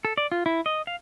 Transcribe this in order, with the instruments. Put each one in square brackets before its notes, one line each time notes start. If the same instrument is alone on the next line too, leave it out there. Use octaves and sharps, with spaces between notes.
[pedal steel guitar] A4
D5
F4
E4
D#5
F5